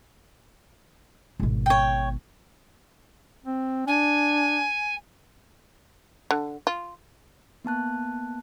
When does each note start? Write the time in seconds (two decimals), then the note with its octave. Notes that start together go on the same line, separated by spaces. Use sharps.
1.40 G#1 B2
1.66 C#5 G5
3.46 C4
3.87 D4 G#5
6.31 D3
6.67 F4
7.65 A#3 B3 A5 F#6